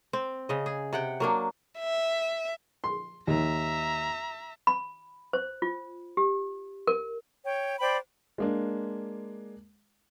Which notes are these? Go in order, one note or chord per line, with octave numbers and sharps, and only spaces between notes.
C4
C#3 D#5
G#4
C3 F#5 G5
F#3 A#3 D4
E5
C6
D#2 E5 A#5
B5
C5
F4
G4
A#4
C#5 G5
C5 D5 G5 B5
G#3 A#3 D4